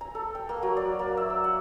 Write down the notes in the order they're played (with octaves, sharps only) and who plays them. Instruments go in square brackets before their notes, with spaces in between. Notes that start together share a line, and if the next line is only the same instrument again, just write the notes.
[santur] A#5
A4
G5
A#3
F#3
D5
A#3
E5
E6
F#5